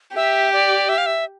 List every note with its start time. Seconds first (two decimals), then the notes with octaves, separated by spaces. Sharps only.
0.16 G4 E5
0.53 D5
0.89 E5
0.98 F5
1.06 E5